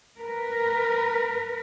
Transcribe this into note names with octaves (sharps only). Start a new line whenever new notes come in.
A#4 B4